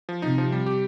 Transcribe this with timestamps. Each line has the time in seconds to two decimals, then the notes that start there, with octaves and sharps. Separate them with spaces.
0.09 F3
0.22 C3 D#4
0.38 F3
0.52 G3
0.66 G4